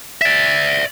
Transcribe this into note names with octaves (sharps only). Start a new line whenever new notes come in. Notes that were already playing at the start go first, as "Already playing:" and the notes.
D5 E5